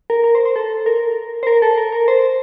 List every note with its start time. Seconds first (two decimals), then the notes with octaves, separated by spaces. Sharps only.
0.10 A#4
0.24 A#4
0.35 C5
0.45 C5
0.56 A4
0.86 A#4
1.43 C5
1.47 A#4
1.62 A4
1.78 A#4
1.92 A#4
2.08 C5